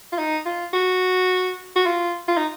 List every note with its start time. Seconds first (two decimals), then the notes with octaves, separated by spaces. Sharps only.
0.13 F4
0.18 D#4
0.45 F4
0.73 F#4
1.76 F#4
1.86 F4
2.28 F4
2.37 D#4